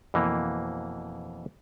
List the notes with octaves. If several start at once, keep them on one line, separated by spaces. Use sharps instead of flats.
F2 B2 E3 A#3